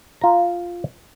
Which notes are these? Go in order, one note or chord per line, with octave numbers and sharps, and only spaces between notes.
F4 A#5